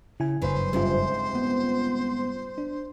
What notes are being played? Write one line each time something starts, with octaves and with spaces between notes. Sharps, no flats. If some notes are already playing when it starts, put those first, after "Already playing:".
C#3 E4 G#5
F#1 G2 F#3 B4 C5
D2 G#2 C3 G3 C#4 F4
B3
D4